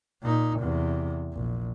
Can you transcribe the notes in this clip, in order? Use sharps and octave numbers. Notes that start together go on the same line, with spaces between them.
A#2 D#4
E2 C3
A#1